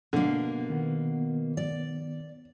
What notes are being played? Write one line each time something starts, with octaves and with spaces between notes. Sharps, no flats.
B2 D3 A#3
D#3 B3
D5